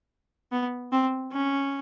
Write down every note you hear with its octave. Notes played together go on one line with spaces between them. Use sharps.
B3
C4
C#4